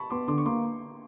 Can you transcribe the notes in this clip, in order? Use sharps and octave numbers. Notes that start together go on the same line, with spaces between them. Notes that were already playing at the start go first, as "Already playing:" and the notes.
Already playing: A5 B5 C#6
B3 C6 D6
D3 C6 D6
C#6
A#3 C6 D6